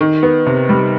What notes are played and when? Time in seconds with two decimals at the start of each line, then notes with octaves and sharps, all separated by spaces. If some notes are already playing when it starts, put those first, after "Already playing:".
0.01 D#3
0.23 B3
0.46 C3
0.69 G3